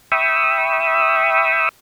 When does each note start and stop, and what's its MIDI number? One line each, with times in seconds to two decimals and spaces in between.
0.12 1.69 76
0.12 1.69 79
0.12 1.69 83
0.12 1.69 85
0.12 1.69 87
0.12 1.69 88